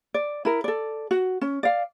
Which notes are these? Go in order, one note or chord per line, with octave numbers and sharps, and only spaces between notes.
D5
E4 A#4
A4 D5
F#4
C#4
D5 F5